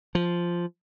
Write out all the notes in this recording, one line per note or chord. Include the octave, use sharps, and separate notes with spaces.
F3